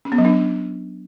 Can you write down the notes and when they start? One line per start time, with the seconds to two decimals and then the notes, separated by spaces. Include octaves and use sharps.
0.05 C#4
0.12 B3
0.18 F#3
0.25 D4